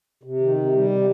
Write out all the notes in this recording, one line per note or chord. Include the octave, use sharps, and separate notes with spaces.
C3
D#3
C3
G3
C3